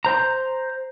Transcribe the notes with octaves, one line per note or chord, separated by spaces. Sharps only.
C5 A#5